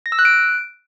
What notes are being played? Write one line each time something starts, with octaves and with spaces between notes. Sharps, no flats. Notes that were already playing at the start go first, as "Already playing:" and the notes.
A#6
E6
F#6
D7